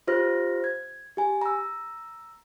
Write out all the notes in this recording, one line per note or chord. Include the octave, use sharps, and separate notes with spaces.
F4 G4 C5 F6 A#6
G#6
G4 G#5
A#5 E6